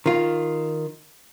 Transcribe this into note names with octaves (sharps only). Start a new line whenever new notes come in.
D#3 F4